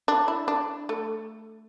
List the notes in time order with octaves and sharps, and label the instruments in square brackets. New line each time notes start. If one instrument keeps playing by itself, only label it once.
[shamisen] D4
E4
D4
A3